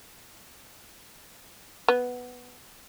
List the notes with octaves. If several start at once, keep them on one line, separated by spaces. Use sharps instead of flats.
B3